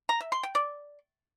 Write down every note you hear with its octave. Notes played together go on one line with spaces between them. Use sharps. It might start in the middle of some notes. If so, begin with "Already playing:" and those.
A#5
E5
C6
G5
D5